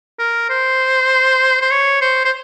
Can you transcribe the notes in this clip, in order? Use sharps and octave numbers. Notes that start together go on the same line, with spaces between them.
A#4
C5
C5
C#5
C5
C5